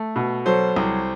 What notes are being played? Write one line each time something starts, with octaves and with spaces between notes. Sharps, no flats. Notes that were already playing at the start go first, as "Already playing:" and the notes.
Already playing: A3
B2
F#3 A4 C5
C2